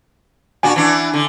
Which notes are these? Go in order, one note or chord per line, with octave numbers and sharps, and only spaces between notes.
A#2 D4 F#4 G#5
E3 D4
D3